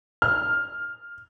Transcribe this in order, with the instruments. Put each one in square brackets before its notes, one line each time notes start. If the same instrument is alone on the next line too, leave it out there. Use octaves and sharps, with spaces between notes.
[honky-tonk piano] F6